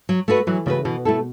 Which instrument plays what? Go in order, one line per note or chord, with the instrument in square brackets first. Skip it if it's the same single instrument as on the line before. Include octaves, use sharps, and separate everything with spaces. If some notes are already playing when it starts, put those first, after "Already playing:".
[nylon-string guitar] F#3
A3 F#4 B4
[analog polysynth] E3 [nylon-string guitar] F#3
[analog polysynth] C#3 [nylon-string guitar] A3 F#4 B4
[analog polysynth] B2 [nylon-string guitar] E3
[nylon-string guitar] A3 E4 A4